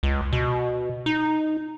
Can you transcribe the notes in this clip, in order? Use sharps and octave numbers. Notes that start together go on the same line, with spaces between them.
C#2
B2
D#4